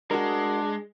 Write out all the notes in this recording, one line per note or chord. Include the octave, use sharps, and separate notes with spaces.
G#3 D4 F#4 A#4